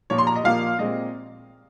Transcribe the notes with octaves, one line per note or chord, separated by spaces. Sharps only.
A#2 F3 A#3 C#5
C6
A#5
D#5
A#2 F3 A#3 F5
A#2 G#3 C4 D#5